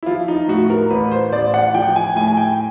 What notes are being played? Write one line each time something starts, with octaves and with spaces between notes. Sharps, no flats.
E4
F3 F4
D#4
A2 F#4
A#4
A1 B4
C5
A1 D5
F#5
F3 G5
G#5
A2 G#5
G#5
G5